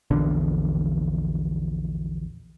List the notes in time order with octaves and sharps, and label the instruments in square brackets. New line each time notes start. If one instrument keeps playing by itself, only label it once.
[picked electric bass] A#1 E2 D3